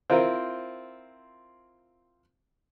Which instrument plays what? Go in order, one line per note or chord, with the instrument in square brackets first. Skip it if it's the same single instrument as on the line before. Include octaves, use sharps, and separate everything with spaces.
[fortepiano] C4 E4 F4 A#4 C5